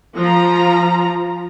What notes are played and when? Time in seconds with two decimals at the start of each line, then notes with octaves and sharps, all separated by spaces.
0.17 F3 A#5